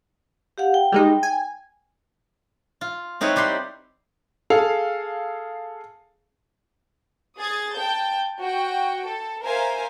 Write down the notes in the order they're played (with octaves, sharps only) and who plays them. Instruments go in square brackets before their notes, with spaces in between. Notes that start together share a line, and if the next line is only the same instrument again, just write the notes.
[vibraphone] G4 F5 F#5
G5
[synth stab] G3 G#3 D#4
G#5
[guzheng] F4
C4 D#4 E4 B4 C#5
G3 G4 F#5 C6
[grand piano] G#4 A4 F5
[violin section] G#4 D#6 G#6 A6
G5 A5 G6
F#4 G5
A4
A#4 C5 E5 F5 G#5